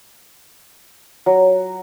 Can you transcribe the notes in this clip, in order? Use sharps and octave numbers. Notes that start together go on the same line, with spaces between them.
F#3